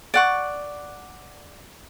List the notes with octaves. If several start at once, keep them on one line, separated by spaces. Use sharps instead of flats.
D5 F#5 C#6